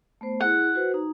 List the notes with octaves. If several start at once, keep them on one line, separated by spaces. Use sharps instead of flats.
A3 B3 C5
E4 G#4 F#5
F#4 B4 C5
D#4 A#5